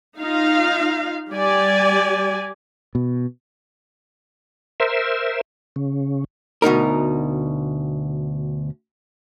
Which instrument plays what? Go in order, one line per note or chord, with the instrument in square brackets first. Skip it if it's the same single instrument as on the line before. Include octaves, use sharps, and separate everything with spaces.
[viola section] D#4 F4 F5
G3 G4 D5 G#5
[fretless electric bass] B2
[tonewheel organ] A#4 C5 E5
C#3
[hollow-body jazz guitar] D2 B2 D#4 A#4